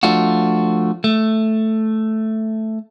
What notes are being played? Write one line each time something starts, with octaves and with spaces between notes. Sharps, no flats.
F3 A3 D4 F4 F#4
A3